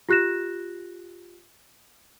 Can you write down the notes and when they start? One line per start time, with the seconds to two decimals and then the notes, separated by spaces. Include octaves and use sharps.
0.09 F4 G4 F#6 A#6 E7